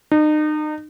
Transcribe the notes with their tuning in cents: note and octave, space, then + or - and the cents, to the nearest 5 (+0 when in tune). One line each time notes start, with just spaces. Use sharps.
D#4 -35